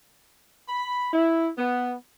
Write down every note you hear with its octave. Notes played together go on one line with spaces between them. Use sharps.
B5
E4
B3